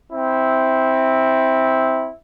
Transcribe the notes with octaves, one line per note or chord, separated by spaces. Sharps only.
C4 E4